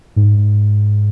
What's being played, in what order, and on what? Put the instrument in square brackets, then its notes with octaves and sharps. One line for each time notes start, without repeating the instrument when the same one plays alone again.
[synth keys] G#2